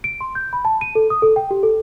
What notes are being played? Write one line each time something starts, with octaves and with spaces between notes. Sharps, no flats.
D7
C6
G6
B5
A5
D#7
A4
D#6
A4
G5
G4
A4